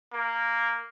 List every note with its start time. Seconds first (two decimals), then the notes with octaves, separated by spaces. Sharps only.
0.13 A#3